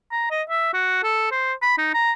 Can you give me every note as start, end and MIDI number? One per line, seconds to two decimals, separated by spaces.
0.11 0.28 82
0.30 0.43 75
0.49 0.70 76
0.73 1.01 66
1.03 1.27 69
1.31 1.53 72
1.62 1.77 83
1.78 1.91 63
1.94 2.12 82